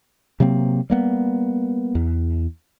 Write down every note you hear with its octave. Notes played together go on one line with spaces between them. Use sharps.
C3 F#3 A#3 C4
G3 A#3 B3
E2